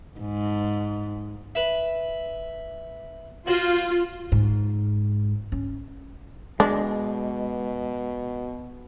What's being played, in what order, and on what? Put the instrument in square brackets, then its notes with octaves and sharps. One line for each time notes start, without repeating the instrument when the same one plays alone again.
[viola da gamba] G#2
[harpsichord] B4 E5
[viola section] F4 [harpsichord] F#4 C5
[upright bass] G#2
C#4
[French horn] B2 [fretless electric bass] G#3 [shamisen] D4